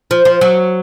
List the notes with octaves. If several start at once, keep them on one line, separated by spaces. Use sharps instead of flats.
F3
F3
F#3